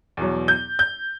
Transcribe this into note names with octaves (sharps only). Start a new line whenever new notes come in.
E2 B2 F#3
G6
G6